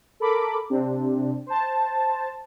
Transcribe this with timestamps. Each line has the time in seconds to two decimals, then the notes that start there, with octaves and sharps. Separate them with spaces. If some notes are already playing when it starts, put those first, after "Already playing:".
0.20 A4 A#4 B5 D6
0.70 C3 C4 D4
1.47 C5 A5